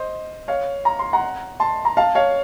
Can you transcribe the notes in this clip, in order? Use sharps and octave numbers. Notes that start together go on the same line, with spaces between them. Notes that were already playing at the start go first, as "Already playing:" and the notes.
Already playing: C5 D#5
C#5 F5
A#5
C6
F#5 A#5
A5 C6
A#5
F5 A5
C#5 F5